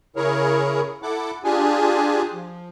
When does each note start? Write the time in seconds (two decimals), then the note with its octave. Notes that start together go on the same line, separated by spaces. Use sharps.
0.16 C#3 E4 G#4 A#4 C#5
1.03 E4 A4 F#5 D6
1.44 D4 F4 G4 G#4 G#5
2.33 F3